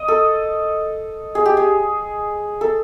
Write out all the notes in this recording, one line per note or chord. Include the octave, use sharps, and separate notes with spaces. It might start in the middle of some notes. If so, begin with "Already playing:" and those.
Already playing: D#5
A4
G#4
G4
G#4
A4